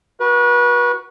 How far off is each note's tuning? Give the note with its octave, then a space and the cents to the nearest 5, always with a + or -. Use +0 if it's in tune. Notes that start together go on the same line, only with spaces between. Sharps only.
F#4 +0 B4 -35